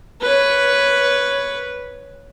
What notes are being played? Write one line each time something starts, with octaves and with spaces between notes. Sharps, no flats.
B4 C#5